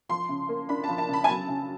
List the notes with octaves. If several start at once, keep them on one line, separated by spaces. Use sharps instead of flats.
F3 C6
C#3
A#3
D4 B5
F3 A5
A5
C#3
B5
G#5
F#3 A5
C#3